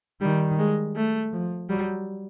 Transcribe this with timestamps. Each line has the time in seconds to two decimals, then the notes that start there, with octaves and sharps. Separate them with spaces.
0.21 D#3 G3
0.58 G#3
0.96 A3
1.33 F3
1.69 F#3 G3